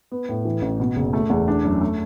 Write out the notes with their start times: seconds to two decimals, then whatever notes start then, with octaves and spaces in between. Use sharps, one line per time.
0.12 B3
0.29 A2
0.45 E3
0.62 A1
0.80 B2
0.96 F#1
1.13 A3
1.30 E2
1.48 D4
1.65 F#2
1.81 A3